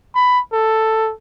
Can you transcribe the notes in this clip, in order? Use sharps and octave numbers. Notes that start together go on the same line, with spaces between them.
B5
A4